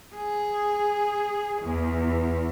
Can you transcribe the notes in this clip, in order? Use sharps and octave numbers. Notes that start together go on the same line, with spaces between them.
G#4
E2